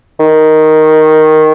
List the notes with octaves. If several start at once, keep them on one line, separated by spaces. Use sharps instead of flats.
D#3